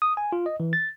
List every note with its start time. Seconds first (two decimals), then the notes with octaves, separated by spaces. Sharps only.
0.02 D#6
0.17 G#5
0.32 F4
0.46 D#5
0.60 E3
0.73 A6